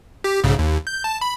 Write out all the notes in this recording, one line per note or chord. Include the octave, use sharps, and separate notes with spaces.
G4
B1 G#2 C#3
D#2
G6
A5
B5